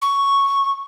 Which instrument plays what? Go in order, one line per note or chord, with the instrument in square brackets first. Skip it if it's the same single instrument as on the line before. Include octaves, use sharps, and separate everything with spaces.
[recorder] C#6